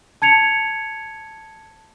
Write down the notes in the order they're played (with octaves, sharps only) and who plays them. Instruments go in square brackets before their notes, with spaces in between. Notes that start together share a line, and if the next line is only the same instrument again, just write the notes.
[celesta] A5 G#6 C#7 F7